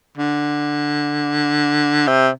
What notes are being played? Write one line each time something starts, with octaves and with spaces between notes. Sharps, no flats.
D3
C3